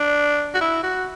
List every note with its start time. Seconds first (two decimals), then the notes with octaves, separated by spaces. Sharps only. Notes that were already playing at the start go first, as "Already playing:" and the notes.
Already playing: D4
0.54 F#4
0.61 E4
0.83 F#4